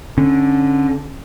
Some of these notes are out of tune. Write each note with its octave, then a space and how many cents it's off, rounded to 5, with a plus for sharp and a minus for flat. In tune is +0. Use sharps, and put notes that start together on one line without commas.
D3 -10 C#4 -25